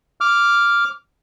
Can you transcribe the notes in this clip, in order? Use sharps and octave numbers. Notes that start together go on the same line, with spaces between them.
D6 F6